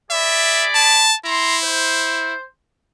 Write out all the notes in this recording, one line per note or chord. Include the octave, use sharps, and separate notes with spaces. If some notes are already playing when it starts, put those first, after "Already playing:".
G#4 D5 E5 B5
A5
E4 A#5 C6
C5